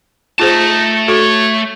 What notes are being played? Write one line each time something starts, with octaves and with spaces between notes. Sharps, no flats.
A3 D#4 F4 G#4 C5 A5
F#4 A4 C#5